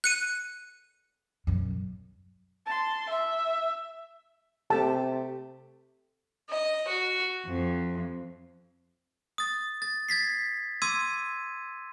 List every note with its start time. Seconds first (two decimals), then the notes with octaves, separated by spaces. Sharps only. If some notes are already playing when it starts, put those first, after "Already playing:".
0.04 F#6 C#7 D#7
1.47 F#2 B2
2.66 A5 C6
3.09 E5
4.70 C3 A3 G4 A5
6.49 D#5
6.88 F#4
7.45 F2
9.38 D#6 A6
9.82 A6
10.09 G#6 A6 B6 C7
10.82 C6 D6 E6 G#6 D#7